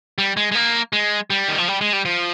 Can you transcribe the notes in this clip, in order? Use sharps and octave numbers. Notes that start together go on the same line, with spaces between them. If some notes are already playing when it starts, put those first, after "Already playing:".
G3
G#3
G#3
A#3
G#3
G3
D#3
F3
G3
G#3
G3
F3